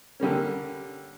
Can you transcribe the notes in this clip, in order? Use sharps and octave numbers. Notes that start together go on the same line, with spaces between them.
D3 G3 A#3 C#4